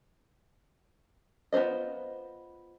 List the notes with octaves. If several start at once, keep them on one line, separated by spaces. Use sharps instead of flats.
B3 F4 G#4 C5 D#5